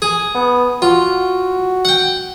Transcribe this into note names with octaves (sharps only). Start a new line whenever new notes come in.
G#4
B3
F4 F#4
F#5 G5